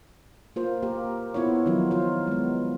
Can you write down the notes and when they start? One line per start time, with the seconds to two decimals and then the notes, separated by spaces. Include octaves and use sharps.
0.56 A#3 F4 C5
0.83 A#3 G4 A#4
1.34 B3 E4 F4 C#5
1.66 D#3 F3 F#3 D#4 F4
1.91 F4 C5
2.27 G#3 B3